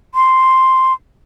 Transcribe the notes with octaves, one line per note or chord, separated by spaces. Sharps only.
C6